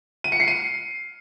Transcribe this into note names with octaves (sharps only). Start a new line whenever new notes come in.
D#7
C#7
C7
D#7